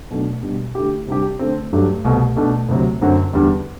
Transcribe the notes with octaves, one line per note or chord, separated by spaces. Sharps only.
B2 F#3 A3 D4
B2 G3 D4
D3 A3 E4 G4
C3 G3 D4 G4
D3 A3 C4
G2 F#3 A3 D4 G4
C2 B2 A3
B2 A3 D4
D2 C3 F#3
F#2 D3 F#3 C4 F#4
E2 D3 G3 D4